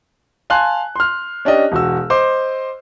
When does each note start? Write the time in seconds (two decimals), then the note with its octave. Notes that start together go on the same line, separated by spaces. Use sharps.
0.50 F5 G#5 A5 C6 F#6
0.96 C6 F6
1.45 C#4 D4 G4 D#5
1.72 E1 F#4 E6
2.10 C5 D#5 C6 D6